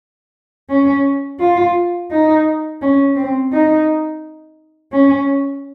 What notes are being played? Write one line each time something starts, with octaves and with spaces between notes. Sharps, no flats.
C#4
F4
D#4
C#4
C4
D#4
C#4